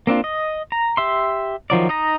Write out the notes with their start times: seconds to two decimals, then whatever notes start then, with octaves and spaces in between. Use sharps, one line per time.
0.07 A#3 C4 D4 F4
0.24 D#5
0.72 A#5
0.97 G4 E5 C6
1.70 D#3 F3 F#3 D5
1.89 D#4 D#5 A#5